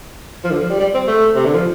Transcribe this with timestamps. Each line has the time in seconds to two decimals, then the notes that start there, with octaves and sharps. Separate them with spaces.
0.44 F3
0.51 D3
0.61 F3
0.70 G3
0.80 G3
0.94 C4
1.07 A3
1.35 C3
1.45 D3
1.54 F3